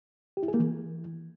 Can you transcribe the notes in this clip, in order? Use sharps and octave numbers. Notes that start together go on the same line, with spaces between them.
G4
E4
G#4
A#3
E3